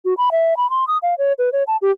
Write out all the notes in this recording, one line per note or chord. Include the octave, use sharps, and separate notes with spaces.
F#4
B5
E5
B5
C6
D#6
F5
C#5
B4
C#5
A5
G4